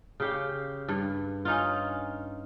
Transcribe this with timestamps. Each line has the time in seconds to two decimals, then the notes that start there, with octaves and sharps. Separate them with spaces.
0.20 C#3 G4 F5
0.88 G2
1.45 C#4 D#4 F4